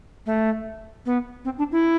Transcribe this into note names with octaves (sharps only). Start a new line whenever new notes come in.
A3
B3
C4
D4
E4